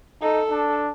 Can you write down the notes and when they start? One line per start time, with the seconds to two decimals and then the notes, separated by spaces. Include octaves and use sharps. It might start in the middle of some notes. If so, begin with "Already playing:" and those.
0.22 D#4 A4
0.50 D4